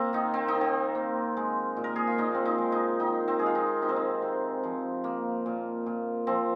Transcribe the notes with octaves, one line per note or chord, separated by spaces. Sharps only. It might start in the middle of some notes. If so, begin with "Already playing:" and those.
Already playing: A#3 C4 F4
D#3 D#4
C4
D#4
D#3
C4
A#3
G#3
A#2
A#4
G#4
F4
A#2 D#4
C4
D#4
G#3
D#4
D#3 D#4
C4
G#3 G#4
F4
D#4
C3 D#4
C4
D#4
C3
F3
A#3
A#2
A#2
F3 C4